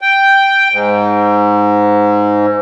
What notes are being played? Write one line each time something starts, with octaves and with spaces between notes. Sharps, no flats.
G5
G#2